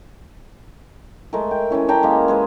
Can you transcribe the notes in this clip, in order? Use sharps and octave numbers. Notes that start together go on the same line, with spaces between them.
G#3 A3 A#4
G5
E3 G#3 C#4 E4
G4 G5 A5 A#5
G#3 A#3
G#3 G#4 B4